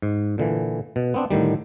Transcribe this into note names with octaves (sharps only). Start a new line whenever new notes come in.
G#2
A#2 D3 E3
B2
B3 C4 D4
A2 D3 D#3 G3